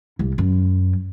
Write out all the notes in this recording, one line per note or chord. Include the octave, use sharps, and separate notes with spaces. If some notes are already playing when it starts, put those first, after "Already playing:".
C2
F#2